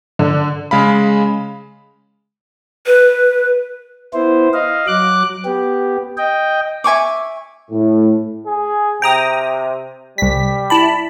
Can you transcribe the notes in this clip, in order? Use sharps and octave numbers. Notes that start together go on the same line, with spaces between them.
D3
C#3 G#3 F5 B5
B4
B3 E4 C5
D#5 F5
F#3 D6 F#6
B3 G4
D#5 G5
E5 G#5 C#6 D6
A2
G#4
C3 G5 A#5 D#6
C2 G3 B6
E4 A5 B5